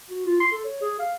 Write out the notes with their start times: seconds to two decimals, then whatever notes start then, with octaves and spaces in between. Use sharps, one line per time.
0.09 F#4
0.26 F4
0.40 C6
0.52 A4
0.65 C#5
0.81 G#4
0.99 F5